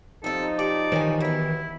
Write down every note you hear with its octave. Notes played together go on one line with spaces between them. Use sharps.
F3 G3 C4 D#4 A4
G4 D5
D#3 E3 C#5 G#5
F#3 B3 E4